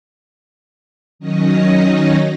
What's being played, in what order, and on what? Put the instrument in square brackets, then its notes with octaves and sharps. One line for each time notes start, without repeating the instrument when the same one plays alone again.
[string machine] D#3 F#3 C#4 D#4 D#5